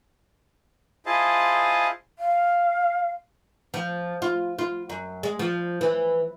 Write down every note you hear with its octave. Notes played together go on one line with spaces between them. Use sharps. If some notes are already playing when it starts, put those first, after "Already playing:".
E4 F4 G#4 C5 D#5 A5
F5
F3
F4
F4
F#2
G#3
F3
E3